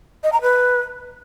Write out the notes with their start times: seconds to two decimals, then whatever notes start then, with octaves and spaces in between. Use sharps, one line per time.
0.23 D#5
0.33 A#5
0.42 B4